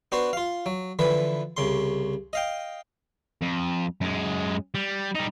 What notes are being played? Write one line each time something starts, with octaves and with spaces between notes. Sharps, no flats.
B3 D4 F#4 C5
F4 F5
F#3
D3 E3 F3 B4
C2 C#3 C6
D#5 F5 G5
F2
F#2 G#3
G3
G3 D#4